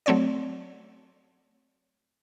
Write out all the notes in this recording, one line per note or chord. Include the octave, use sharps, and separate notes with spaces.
F#3 A3 C4 C#5 D5